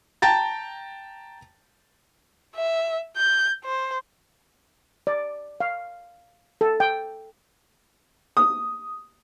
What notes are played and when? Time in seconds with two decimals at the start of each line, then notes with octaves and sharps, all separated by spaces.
0.22 G5 A5 A#5 A6
2.55 E5
3.17 G6
3.64 C5
5.07 D5
5.60 F5
6.61 A4
6.80 G5
8.37 D#6